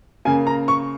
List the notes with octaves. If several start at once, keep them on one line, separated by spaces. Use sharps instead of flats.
C#3 A#3 G#5
A#5
C#6